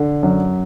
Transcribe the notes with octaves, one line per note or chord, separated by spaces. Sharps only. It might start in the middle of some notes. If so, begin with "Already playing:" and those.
Already playing: D3
F#2